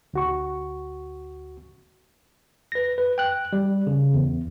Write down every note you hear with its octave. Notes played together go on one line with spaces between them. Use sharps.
D2 F#4 C#6
B4 A#6
B4
G5 F#6
G3
C#3
E2